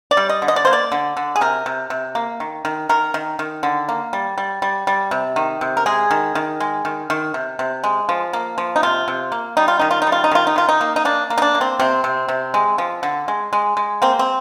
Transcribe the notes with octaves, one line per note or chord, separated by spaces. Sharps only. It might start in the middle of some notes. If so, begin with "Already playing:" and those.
D5
G3
D#5
D3
D#5
D5
A#3 C5
D5
D3
D3
G#4
C3 A#4
C3
C3
A#3
D#3
D#3
D#3 A#4
D#3
D#3
D3
A#3
G3
G3
G3
G3
C3
D#3
C3
A#4
G#3 G#4
D#3
D#3
G#3
D#3
D#3
C3
C3
G#3
F3
A#3
F3
D#4
C3 F4
C3
A#3
G3 D#4
F4
D#3 D#4
F4
D#4
G3
F4
D#4
D#3 F4
D#4
D#3 F4
D#4
A#3
D#4
A#3 D4
A#3
D#4
D4
A#3
C4
C3 C4
C3
C3
G#3
F3
D3
G#3
G#3
G#3
A#3 C4
C4